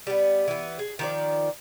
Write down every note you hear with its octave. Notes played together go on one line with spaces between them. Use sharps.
G3 B3
E3 B3
G#4
D#3 F3 D5